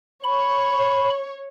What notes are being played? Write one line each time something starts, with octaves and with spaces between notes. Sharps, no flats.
C#5 B5